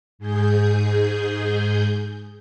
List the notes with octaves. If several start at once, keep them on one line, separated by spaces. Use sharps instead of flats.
G#2 G#4 G6